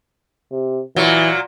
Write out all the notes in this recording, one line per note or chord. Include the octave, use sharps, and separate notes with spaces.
C3
A#2 E3 F#3